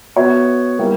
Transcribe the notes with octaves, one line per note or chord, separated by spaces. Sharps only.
B3 F#4 C#5 E5
G3 A#3 E4 G4